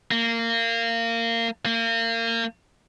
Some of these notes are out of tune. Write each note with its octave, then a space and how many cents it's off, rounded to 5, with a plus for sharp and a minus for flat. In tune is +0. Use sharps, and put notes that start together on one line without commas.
A#3 -20
A#3 -30